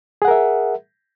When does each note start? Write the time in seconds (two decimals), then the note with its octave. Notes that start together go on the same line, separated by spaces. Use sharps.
0.22 G#4
0.25 F#5
0.28 A#4
0.31 E5